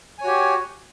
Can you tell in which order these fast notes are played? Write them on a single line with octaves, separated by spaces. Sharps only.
G#5 C#5 F#4 G4